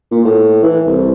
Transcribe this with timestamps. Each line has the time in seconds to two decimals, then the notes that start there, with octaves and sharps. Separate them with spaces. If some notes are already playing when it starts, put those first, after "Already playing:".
0.11 A#2
0.25 A2
0.63 E3
0.87 C2